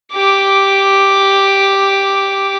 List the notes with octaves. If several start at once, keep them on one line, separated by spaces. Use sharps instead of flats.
G4 D6